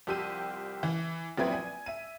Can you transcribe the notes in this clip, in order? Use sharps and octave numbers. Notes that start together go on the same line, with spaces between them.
C2 F3 G4 E6 G6 D#7
E3
A#1 F#3 C4 E4 B4 G#6
G#5
E5 D#7